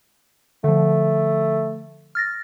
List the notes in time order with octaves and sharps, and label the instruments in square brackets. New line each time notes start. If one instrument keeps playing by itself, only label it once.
[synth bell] D3 F3 [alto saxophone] A3
[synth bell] F6 A6 A#6